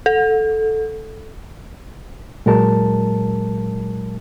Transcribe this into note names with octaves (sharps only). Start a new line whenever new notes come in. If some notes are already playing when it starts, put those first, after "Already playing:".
A4
A#2 F#3 G#3 A#4 A5